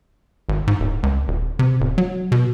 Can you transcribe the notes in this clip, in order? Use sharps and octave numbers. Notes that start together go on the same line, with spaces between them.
G#1
G#2
D1
C#2
D#1
C3
D1
F#3
B2